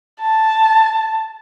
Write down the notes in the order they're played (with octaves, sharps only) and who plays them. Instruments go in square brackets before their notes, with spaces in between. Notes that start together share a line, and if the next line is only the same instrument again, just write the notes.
[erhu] A5